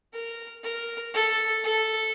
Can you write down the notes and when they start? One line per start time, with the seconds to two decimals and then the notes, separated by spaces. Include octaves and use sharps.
0.13 A#4
0.63 A#4
1.14 A4
1.64 A4